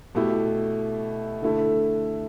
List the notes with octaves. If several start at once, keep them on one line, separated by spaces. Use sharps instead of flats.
B2 A3 E4 G4
D3 A3 E4 A4